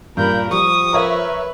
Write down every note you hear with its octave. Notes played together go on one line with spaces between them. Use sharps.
G2 A#2 A#4 B5 G6
F3 G3 C#6 D#6
A#4 B4 C#5 E5